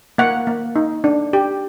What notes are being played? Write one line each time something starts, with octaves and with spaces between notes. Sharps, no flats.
A#3 F#5
A#3
D#4
D4
G4